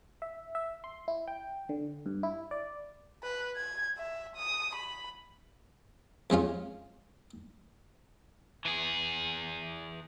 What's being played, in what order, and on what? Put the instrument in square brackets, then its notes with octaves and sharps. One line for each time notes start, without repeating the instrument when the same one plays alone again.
[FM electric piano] E5
E5
C6
E4
G5
D3
G2
E4
D5
[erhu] B4
G#6
E5
D#6
B5
[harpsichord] F2 G#3 C#4 F4
[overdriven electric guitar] E3 G#4